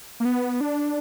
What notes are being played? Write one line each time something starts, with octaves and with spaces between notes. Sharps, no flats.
A#3
B3
D4